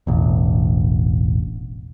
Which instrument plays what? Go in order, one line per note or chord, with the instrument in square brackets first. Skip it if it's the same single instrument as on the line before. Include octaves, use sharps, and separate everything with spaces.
[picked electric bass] E1 A1